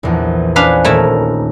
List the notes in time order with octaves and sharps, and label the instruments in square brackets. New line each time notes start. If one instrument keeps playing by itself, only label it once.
[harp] A#1 E2 E3
[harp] C#4 C5 G#5 [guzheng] D4 B4 F5
[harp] D#1 A#4 C#5 [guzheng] A3 E4 A5